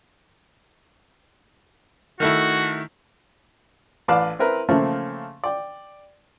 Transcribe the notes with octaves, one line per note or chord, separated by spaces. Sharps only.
D#3 A3 E4 F#4
A1 B4 D5 F5 A5
C4 E4 A#4 B4
C#3 F3 A3 A#3 C4
D5 G5